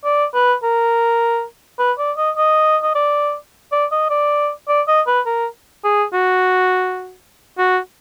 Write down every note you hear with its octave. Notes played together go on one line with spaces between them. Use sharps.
D5
B4
A#4
B4
D5
D#5
D#5
D#5
D5
D5
D#5
D5
D5
D#5
B4
A#4
G#4
F#4
F#4